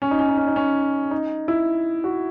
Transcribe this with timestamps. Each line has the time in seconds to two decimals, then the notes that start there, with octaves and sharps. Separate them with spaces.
0.02 C#4
0.11 D#4
0.19 C#4
0.29 D#4
0.37 C#4
0.47 D#4
0.56 C#4
1.11 D#4
1.48 E4
2.04 F#4